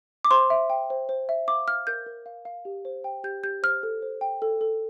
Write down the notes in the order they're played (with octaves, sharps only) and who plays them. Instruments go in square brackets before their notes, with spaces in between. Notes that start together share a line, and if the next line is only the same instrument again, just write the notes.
[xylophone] D6
C5 C6
E5
G5
C5
C5
E5
F5 D6
F5 F6
A#4 G6
A#4
F5
F5
G4
C5
G5
G4 G6
G4 G6
C5 F6
A4
C5
G5
A4
A4